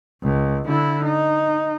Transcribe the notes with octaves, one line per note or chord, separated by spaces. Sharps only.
C#2
D3 E4
D#4